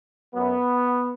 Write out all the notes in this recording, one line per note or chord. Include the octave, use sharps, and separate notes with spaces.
F#2 F#3 B3